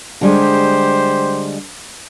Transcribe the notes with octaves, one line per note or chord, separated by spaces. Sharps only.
D3 G3 G#3 G4 C5